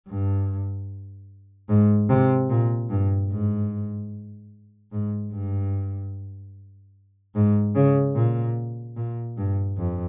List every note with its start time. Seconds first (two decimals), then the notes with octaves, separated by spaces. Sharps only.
0.08 G2
1.69 G#2
2.09 C3
2.50 A#2
2.90 G2
3.32 G#2
4.92 G#2
5.33 G2
7.35 G#2
7.75 C#3
8.15 A#2
8.97 A#2
9.38 G2
9.78 F2